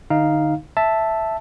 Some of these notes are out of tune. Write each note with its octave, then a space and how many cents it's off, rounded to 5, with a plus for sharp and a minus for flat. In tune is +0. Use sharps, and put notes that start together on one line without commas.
D3 +35 D#4 +0 F5 +0
E5 +0 A5 +0